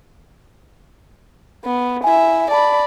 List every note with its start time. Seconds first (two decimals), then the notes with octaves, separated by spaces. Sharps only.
1.64 B3
2.04 E4 E5 G#5
2.51 D5 A5 B5